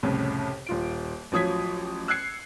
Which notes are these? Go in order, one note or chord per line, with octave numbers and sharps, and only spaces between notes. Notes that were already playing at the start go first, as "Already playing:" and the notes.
C2 F2 A2 C#3
D#1 F4 D7
A1 F3 F#3 D#6 G#6 B6
E6 F#6 G#6 C7 C#7